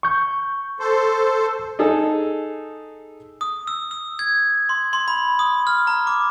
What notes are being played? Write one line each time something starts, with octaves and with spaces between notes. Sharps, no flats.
C#6 G6
A4 C5
D#4 G#4 A4
D#6
E6
E6
G#6
C6
C6
B5
D#6
F6
A#5
D6